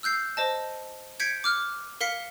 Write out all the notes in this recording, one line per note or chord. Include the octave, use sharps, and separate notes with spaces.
E6 F#6 G6 C7
C5 D#5 A5
G6 G#6 B6 C#7 D7
D6 F6 F#6
A#4 F5 B6 C#7